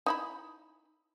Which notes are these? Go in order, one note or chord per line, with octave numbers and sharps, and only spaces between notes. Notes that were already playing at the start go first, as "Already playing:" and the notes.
D#4 E4 B5